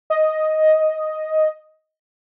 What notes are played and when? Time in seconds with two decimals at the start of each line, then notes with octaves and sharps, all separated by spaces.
0.10 D#5